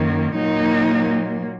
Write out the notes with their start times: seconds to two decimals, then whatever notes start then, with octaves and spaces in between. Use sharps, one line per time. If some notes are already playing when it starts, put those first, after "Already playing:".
Already playing: F#2 D#3 A#3
0.34 A#2 F#3 A#3 D#4